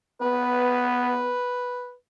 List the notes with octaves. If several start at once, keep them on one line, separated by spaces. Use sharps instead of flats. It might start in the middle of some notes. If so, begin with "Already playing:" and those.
B3 B4